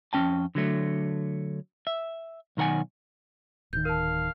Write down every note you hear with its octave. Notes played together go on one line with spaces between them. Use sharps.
F2 B2 C#4 G5 A5
D3 F#3 A3
E5
B1 D#3 A#4 F#5 G#5
D1 D#3 G6
A#4 F5 A5